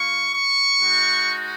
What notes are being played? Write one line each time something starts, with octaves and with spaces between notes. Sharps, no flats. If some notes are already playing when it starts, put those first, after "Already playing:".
Already playing: A#3 F4 C#6
C#6
G#3 D#4 F#4